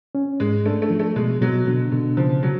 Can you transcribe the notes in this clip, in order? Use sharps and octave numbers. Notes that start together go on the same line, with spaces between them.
C#4
G#2 G#3
A3 D4
A3
F3
A3
B2 G#3
B2 F#3
B2 D3
B2 D3
C#3 F3
F#3